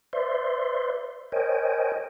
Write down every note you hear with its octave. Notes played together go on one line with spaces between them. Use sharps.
B4 C5 D5 E5 C6
A#4 C5 C#5 D#5 G5 G#5